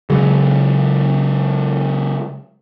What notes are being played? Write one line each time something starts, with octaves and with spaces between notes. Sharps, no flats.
C#3 F#3 G#3